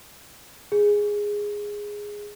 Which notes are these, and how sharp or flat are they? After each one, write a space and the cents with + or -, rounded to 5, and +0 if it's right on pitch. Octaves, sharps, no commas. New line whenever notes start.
G#4 -5